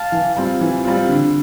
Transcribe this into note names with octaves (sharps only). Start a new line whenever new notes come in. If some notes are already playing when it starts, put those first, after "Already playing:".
Already playing: F5 A5
E3
G3 C4 F4
E3
G3 C4 F4
D3